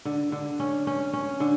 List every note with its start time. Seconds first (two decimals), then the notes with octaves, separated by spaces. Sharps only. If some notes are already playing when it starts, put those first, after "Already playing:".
0.05 D3
0.32 D3
0.60 C#4
0.87 C#4
1.13 C#4
1.40 D3